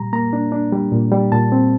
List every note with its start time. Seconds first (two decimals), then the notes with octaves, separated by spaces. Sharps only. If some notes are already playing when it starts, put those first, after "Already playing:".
Already playing: A#2 G3 A#5
0.13 A#3 A#5
0.33 D4
0.52 D4
0.72 G3
0.92 A#2
1.12 G3
1.32 A#2 A5
1.52 C4